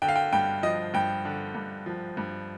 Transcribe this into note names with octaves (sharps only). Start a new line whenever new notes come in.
D3 G5
F5
G5
G2 G5
F3 D#5
G2 G5
D3
G2
F3
G2